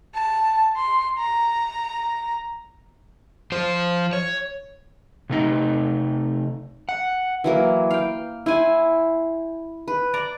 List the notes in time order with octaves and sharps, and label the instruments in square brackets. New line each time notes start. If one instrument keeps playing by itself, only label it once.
[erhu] A5
C6
A#5
[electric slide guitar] F3 C5
C#5
C3 A3 D#4
F#5
[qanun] E3 F#3 A#3
F5 G5
E4 C5 G#5
B4
D5 A#5